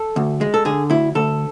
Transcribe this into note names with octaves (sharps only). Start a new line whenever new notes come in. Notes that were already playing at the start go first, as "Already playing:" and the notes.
Already playing: A4
D2
G#3
A4
D3 G#4
D2 E4
D2 A4